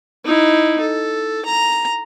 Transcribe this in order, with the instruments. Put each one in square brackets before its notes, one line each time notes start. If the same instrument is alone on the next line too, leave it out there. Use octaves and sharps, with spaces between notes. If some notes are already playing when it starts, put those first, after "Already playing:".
[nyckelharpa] D#4 E4
A4
A#5